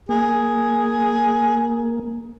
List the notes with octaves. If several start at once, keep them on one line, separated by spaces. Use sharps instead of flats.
A#3 G#4